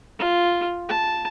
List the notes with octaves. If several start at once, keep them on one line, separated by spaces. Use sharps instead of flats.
F4
A5